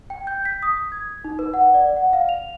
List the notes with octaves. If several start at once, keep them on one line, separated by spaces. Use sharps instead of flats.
G5
G6
B6
D#6
G#6
D#4
B4
F#5
D5
F#5
F5
F7